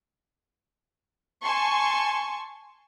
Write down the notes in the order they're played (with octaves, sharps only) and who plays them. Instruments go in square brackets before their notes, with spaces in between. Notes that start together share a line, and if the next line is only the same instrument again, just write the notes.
[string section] G#5 A5 C6 C#6